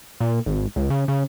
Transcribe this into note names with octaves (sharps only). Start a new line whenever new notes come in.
A#2
G#1
C#2
C#3
C#3